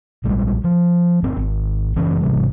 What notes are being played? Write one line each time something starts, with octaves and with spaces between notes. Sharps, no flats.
A#1 G3 G#3
F3
G1 C4
G#1
F#1 E3 C4 C#4
G#1 C3 E3 G3